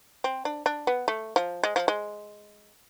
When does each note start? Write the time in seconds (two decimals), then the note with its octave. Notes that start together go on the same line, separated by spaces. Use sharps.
0.24 C4
0.45 D4
0.66 D4
0.87 B3
1.08 A3
1.36 F3
1.64 G#3
1.76 F3
1.88 G#3